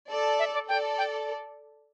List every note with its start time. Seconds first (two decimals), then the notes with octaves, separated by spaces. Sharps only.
0.10 A4 D5
0.39 E5
0.54 D5
0.68 A4 D5 G5
0.98 G5